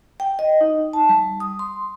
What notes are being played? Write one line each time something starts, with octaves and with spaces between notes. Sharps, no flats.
G5
D#5
D#4
A5
G3
D#6
C6